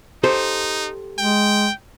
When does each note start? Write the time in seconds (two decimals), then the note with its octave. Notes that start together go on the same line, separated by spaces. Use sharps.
0.24 D#4 G4 A4 C5
1.19 G#3 G5